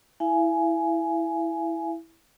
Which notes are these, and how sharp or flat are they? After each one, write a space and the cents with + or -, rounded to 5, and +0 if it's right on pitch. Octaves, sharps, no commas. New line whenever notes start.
E4 +0 F5 -45 G#5 +10